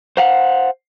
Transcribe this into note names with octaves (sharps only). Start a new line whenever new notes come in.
C5 F5 F#5